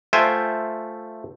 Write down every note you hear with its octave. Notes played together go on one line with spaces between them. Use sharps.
A3 F4 C5 E5 G5 G#5